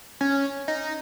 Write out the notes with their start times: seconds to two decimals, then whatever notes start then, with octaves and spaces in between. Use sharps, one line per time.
0.21 C#4
0.68 D#4